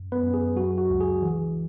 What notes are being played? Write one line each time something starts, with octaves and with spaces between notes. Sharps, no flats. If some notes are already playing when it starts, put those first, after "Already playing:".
Already playing: F#2
B3 B4
F#2
G#4
F#3 F#4
F#4
C#2
G#4
E3